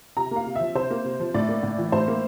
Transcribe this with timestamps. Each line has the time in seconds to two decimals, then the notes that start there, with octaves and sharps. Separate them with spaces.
0.17 C3 A#5
0.31 A#3 F5
0.46 C3
0.55 E5
0.61 F3
0.75 C3 C5
0.91 A#3
1.05 C3
1.20 F3
1.34 A2 D5
1.49 A#3
1.63 A2
1.78 E3
1.92 A2 C5
2.08 A#3